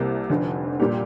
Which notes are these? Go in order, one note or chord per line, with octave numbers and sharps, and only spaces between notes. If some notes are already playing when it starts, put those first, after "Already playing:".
Already playing: C2 C3 G3 A#3
F1 F2 D3
A#2 G3 D4 G4